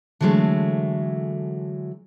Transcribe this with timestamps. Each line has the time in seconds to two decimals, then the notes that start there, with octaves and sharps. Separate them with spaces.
0.21 D3 E3 F#3 G#3 A3